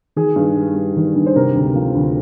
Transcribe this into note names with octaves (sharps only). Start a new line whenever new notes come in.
D#3 G#4
G2
G3
G2
D#3
G2
C5
C3 A#4
D2
F3
D2